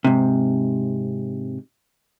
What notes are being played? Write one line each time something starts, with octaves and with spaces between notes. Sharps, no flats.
G#2 C3